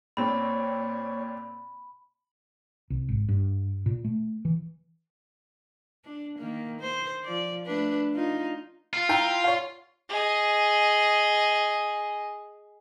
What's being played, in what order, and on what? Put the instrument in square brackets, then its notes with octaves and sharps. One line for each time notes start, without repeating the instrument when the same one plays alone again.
[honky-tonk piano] A#2 C4 [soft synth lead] C#5 [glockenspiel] B5
[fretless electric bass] C2
G#1
G2
A#2
A3
E3
[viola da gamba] D4
D#3 A#3
C5
F3 D5
A3 D4 B4
D#4 F4
[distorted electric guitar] F4
[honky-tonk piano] E4 G5 A#5
C#5 F5
[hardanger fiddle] G#4 D#5